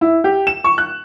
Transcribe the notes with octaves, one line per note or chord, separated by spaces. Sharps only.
E4
G4
E7
C#6
F#6